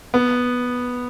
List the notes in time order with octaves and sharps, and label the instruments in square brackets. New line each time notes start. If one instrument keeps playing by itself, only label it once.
[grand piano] B3